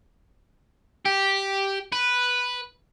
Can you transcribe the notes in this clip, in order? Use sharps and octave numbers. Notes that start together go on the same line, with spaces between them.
G4
B4